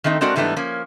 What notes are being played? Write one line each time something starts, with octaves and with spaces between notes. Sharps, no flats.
D#3 A3 C4 D#4
G#3 C4 D4 F#4 A#4 D5
G#2 E3 G3 A3 B3 D4
F3 A#3 C#4